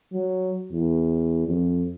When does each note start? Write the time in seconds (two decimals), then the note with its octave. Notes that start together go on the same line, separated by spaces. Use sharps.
0.13 F#3
0.72 E2
1.47 F2